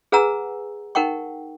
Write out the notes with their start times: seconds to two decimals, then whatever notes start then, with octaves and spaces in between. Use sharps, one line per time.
0.12 G#4 B4 F#5 G#5 A#5 E6
0.95 D#4 A#4 F#5 G5 C#6